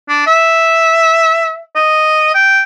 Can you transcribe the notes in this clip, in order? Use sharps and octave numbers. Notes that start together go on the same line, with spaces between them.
D4
E5
D#5
G5